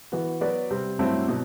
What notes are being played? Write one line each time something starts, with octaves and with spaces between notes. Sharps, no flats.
E3 B3 F#4
F#3 B3 F#4 B4 D5
C3 G3 C4
G2 F#3 A3 C4 E4
B2 F#3